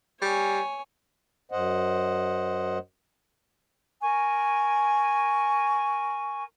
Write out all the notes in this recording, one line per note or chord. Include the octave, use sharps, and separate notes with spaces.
G3 C#5 G#5
F#2 C5 D#5 F#5
A#4 G#5 C#6